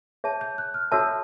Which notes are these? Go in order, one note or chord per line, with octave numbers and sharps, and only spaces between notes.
G#4 C#5 E5 A5
G6
F#6
F6
F#4 A4 C#5 E5 A5 E6